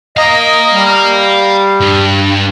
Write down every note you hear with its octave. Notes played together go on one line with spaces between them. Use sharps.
D#5 F5 A#5
G3
G2